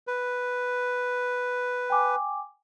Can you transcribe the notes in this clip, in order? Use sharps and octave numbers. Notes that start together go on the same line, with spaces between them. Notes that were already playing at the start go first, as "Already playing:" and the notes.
B4
G5 G#5 D6